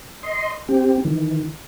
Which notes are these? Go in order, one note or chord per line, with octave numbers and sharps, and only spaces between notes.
D#5 C6
C4 G4
D#3 E3